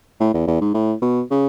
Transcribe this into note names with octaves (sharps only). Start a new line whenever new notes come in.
A2
E2
E2
G#2
A2
B2
C#3